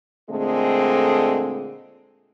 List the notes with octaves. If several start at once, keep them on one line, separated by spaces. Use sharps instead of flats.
A#2 D3 G#3 A3 C4 G#4